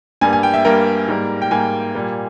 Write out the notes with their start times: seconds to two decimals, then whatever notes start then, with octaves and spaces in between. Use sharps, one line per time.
0.21 G2 G3 A#3 G#5
0.33 G#5
0.43 G5
0.54 E5
0.65 G2 G3 A#3 A#4
1.08 G#2 G3 A#3
1.42 G5
1.51 G#2 G3 A#3 G#5
1.95 A#2 G3 A#3